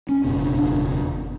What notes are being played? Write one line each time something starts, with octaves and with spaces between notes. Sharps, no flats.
C#4
F#1 E2 B2 C#4
D4
D4